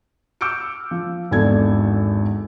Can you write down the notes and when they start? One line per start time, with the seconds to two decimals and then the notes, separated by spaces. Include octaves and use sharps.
0.41 D6 E6 F6 G6 C#7 D7
0.91 F3
1.31 G#1 E2 D4 A4 G#6